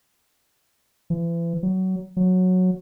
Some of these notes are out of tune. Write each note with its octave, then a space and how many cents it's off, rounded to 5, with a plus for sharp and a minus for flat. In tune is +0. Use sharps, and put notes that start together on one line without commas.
E3 +40
F#3 +20
F#3 -10